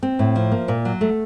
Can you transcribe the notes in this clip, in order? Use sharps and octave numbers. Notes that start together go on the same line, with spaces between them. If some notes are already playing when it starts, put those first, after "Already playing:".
C4
A2
F3
A#3
A#2
F#3
A3